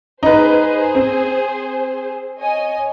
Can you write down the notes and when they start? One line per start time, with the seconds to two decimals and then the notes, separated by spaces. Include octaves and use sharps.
0.23 D#4 G#4 B4 C5
0.95 C4
2.39 C#5 D#5 G#5